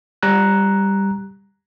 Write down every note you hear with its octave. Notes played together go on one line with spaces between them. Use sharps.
G3 A#5 F#6